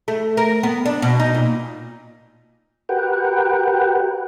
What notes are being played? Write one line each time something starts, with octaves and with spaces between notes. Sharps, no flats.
A3
A#4
B3
D4
B2
D#4
A#2
F#4 G4 A#4 B4 F#5 G5